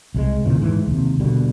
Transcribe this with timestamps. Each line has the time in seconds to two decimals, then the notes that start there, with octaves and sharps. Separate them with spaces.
0.15 C2 F3 G#3
0.45 D#2 A#2 C#3 E3
0.62 G#2 E3
0.87 D#2 C3
1.20 B2 D3 G3